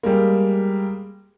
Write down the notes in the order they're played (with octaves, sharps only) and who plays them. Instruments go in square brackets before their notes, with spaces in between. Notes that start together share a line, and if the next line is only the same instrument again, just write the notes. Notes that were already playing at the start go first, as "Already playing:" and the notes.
[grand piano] G3 G#3 A#3